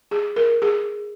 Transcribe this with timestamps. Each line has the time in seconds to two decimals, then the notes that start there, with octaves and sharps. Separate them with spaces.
0.11 G#4
0.36 A#4
0.62 G#4